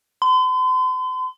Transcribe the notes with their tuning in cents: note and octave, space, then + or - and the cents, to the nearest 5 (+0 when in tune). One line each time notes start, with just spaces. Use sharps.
C6 -45